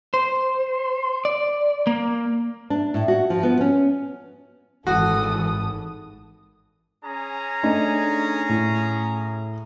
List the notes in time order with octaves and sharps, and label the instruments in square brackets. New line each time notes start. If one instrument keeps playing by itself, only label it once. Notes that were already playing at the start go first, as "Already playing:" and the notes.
[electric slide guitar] C5
D5
A#3
[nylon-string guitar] D4
A2
F#4
F3
B3
C#4
[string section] G#1 [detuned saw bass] E3 [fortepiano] F#4 [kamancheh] A4 D#6
[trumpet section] C#4 G#4 A#5
[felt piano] A3 D4 D#4
A2